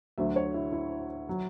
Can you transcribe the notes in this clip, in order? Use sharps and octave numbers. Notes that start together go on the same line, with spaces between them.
D2 D3 F#3 E5
C#5
E4
E4
F#3